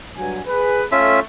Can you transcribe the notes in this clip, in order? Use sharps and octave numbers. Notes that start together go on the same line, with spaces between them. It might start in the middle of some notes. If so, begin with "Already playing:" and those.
G2 F#3 G#5
G#4 B4
A3 C#4 F4 E5